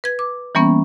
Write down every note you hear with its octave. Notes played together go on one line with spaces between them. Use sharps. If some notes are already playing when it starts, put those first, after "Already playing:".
B4 G#6
D6
E3 G3 A#3 B3 C#4